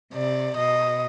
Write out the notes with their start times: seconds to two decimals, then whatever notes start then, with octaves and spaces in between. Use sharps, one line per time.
0.14 C3 D5
0.57 B2 D#5